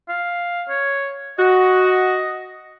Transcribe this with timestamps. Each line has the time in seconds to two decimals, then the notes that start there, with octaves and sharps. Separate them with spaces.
0.09 F5
0.70 C#5
1.39 F#4 D#5